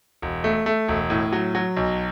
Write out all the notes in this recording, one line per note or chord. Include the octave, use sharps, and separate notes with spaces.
E1
A3
A3
E1
A2
F#3
F#3
B1